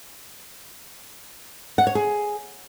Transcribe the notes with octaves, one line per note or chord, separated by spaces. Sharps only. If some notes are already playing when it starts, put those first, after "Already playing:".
F#5
C#5
G#4